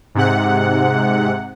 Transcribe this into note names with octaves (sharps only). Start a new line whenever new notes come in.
G#2 C3 F#5